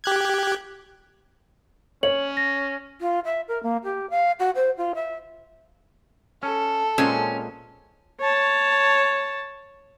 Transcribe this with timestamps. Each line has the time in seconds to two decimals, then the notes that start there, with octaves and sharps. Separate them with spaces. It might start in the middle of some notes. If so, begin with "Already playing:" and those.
0.04 G4 F#6 G#6
2.03 C#4 C#5 F#7
2.37 A#6
3.00 F4
3.24 E5
3.48 A#4
3.63 A#3
3.83 G4
4.10 F5
4.39 F#4
4.55 C5
4.77 F4
4.94 E5
6.43 C#4 A4
6.98 A#2 G#3 C4 C#4
8.20 C#5 A5